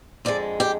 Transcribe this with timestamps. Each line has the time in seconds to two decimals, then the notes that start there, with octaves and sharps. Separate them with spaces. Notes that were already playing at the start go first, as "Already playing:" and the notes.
0.25 F2 D3 G#3 D5
0.60 G4